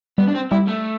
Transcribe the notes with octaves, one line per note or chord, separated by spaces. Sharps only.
G3 B3
D4
C4
G3 E4
A3